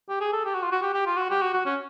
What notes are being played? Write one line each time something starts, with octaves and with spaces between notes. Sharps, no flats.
G4
G#4
A4
G4
F#4
F4
F#4
G4
G4
F4
F#4
G4
F#4
F#4
C#4